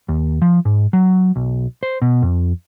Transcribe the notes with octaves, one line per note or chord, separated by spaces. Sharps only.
D#2
F3
G#2
F#3
B1
C5
B2
F2